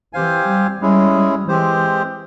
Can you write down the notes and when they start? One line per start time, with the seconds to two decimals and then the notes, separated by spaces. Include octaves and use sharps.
0.13 E3 C4 G4 C5 F5 G#5
0.47 G3
0.81 G3 G#3 C#4 E4 G#4
1.48 E3 G#3 C4 G4 C5